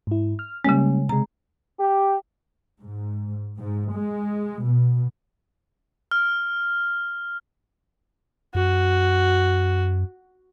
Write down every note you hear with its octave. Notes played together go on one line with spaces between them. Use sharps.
G#2 E4
F6
C#3 G3 G#3 A#3 C#4
C3 G#3 A#5
G4
G#2
G#2
G#3
B2
F6
F#2 F#4